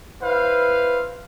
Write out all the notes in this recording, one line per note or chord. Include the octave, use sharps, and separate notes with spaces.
E4 B4 C5 F5